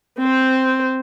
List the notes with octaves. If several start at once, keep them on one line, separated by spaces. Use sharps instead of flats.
C4 C5